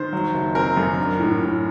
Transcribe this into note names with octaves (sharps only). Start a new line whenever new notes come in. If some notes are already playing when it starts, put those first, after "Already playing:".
Already playing: D#3 C5
F#3
F#1
C4 A#4
F#2
D4
A2
A2